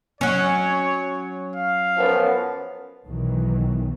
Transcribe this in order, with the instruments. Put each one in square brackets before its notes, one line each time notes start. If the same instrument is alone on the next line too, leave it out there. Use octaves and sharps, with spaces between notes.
[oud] F#3 C#4 [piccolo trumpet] C#5
[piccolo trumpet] F5
[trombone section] F#2 F3 B3
[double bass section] B1 B2 D#3 E3 F#3